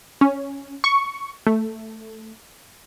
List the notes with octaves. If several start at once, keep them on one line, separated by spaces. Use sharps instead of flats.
C#4
C#6
A3